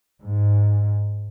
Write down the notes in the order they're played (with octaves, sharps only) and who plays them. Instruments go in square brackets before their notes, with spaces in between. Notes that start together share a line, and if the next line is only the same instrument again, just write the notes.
[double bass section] G#2